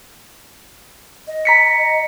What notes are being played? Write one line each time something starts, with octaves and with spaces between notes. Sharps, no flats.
D#5
A#5 B6 C#7